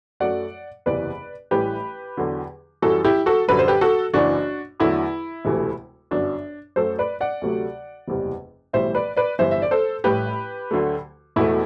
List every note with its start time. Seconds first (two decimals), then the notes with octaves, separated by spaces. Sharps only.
0.20 F#2 F#3 A3 D5 F#5
0.86 F#1 E2 C3 E3 B4 D5
1.51 A1 A2 E3 G3 G4 B4
2.17 E2 D3 F#3
2.82 F#2 E3 G3 F#4 A4
3.05 E4 G4
3.26 F#4 A4
3.48 F#2 D3 G3 B4
3.59 C5
3.68 G4 B4
3.81 F#4 A4
4.14 F#1 F#2 E3 D4 F#4
4.80 E2 D3 F#3 A3 E4
5.45 E1 D2 C3 E3 A3
6.11 G1 F#2 F#3 D4
6.76 F#2 F#3 A3 A4 C5
6.99 B4 D5
7.21 D5 F#5
7.42 D2 C3 F#3 A3
8.08 F#1 E2 C3 G3
8.73 B1 A2 E3 G3 C5 E5
8.95 B4 D5
9.16 B4 D5
9.39 G1 G2 E3 C5 E5
9.51 E5
9.62 D5
9.71 A4 C5
10.04 A1 A2 G3 G4 B4
10.71 D2 D3 F#3 A3
11.36 E1 E2 B2 A3 E4